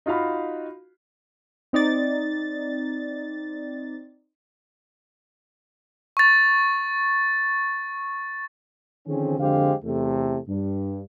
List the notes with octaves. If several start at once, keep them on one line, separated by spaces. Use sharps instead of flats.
D#4 F4 F#4 F5 B5
C4 D#4 D5 A6
C#6 A6
D3 D#3 F3 C4 C#4 G#4
F2 D3 G#3 G4 C5 F5
E2 C3 A3
G2